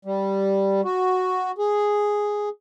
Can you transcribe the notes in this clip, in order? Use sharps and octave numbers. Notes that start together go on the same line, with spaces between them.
G3
F#4
G#4